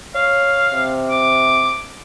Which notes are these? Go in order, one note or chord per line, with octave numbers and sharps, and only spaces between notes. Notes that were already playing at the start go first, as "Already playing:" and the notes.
C#5 F5
C3
D6